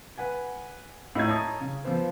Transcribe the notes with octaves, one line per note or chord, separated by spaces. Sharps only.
B4 F#5 G#5
A2 D#5 A#5 G#6
C#5 A5 A#5 D#6
C#3 C#4
F3 B3 C5